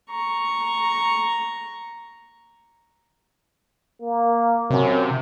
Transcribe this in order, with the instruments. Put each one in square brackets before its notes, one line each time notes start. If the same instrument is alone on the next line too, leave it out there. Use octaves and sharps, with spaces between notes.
[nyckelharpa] A#5 C#6
[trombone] A#3
[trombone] F#2 [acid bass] C3